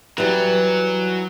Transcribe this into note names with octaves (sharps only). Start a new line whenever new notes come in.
E3 F#3 G3